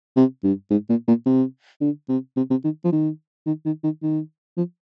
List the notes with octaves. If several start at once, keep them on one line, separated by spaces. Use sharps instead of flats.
C3
G2
G#2
A#2
A#2
C3
D3
C3
C3
C3
D#3
F3
D#3
D#3
D#3
D#3
D#3
F3